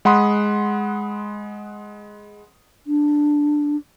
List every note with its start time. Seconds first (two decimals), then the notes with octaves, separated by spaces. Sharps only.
0.05 G#3 F#5 B5 C6 D#6
2.87 D4